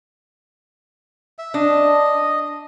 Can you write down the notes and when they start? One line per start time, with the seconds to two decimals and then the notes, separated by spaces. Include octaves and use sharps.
1.39 E5
1.54 D4 D#5